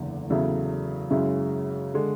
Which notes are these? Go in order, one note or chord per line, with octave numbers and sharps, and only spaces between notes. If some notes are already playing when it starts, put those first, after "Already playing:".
Already playing: F#1 E2 D3
E2 C#3 F#3 A3 E4
F#2 C#3 G#3 C#4 E4
D3 G#3